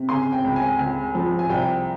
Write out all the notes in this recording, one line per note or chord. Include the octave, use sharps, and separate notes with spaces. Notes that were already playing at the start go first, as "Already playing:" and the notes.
Already playing: C3
C#3 G#5 C6
G5
C#2
G#5
C#2
F3
G#5
C2 G5